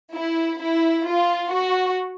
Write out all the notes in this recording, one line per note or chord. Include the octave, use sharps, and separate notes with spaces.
E4
E4
F4
F#4